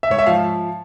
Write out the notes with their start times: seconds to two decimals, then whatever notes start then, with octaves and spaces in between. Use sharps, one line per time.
0.03 E5
0.10 G#2 C#5
0.18 E5
0.26 F3 F5